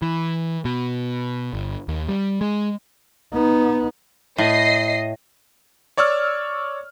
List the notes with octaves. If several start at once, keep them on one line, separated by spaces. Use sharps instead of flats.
E3
B2
G1
D#2
G3
G#3
B3 D#4
A2 D#5 C7
C#5 D5 C#6 E6 F6